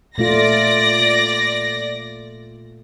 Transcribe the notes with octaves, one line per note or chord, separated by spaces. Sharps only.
A#2 A3 F4 D5 A#6